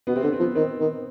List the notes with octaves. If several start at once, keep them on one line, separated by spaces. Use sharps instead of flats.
B2 B3
C3 C4
D3 B3
C4
F3 B3
D#3 C4
D#3